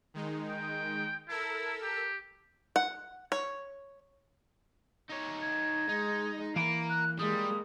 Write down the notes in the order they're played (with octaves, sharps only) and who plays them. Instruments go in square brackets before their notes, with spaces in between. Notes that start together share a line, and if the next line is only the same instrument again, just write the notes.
[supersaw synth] D#3 G#3 D#4
[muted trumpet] G5
[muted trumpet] E4 [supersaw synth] A4 A#4 E6
[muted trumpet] G4
[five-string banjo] F#5
C#5
[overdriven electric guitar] D#4 C#5
[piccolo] G#6
[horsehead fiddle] G#3 [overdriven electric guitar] D#4
[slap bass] E3 [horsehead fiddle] A#3 [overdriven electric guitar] F5 A#5 [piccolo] D7
[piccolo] F#6
[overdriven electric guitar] G3 [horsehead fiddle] G#3 A#3 [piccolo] D#6